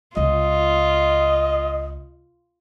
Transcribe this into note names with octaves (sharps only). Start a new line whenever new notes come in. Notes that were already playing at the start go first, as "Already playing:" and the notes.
C#2 F4 D#5